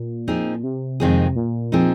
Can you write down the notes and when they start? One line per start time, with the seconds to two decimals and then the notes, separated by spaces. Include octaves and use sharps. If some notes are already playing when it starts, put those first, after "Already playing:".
Already playing: A#2
0.28 F3 C4 D#4 G#4
0.63 C3
1.00 F2 D#3 G#3 C4 G#4
1.36 A#2
1.72 F3 C4 D#4 G#4